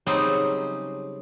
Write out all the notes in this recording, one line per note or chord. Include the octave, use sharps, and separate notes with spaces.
C#3 F#3 G3 C4 D#4 G#4